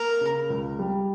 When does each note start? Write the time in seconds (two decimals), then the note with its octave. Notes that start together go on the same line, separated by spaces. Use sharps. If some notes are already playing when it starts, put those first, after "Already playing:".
Already playing: A#3 A#4
0.21 C#3
0.50 C#2
0.79 G3